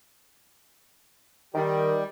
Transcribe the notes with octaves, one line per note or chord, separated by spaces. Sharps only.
D#3 G3